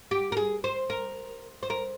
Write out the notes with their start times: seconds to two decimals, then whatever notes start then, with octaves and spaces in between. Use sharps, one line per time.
0.11 G4
0.32 A#4
0.37 G#4
0.64 C5
0.90 A#4
1.63 C5
1.70 A#4